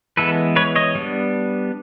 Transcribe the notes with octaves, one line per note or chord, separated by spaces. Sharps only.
E3 G#3 B3 A4 B4
B4 C#5
C#5 D#5
G3 B3 D4